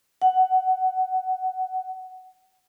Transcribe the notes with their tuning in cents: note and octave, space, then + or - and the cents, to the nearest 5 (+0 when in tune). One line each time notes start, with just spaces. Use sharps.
F#5 +10